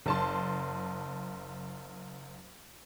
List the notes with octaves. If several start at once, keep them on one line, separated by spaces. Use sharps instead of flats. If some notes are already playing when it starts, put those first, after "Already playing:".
F#1 A5 C6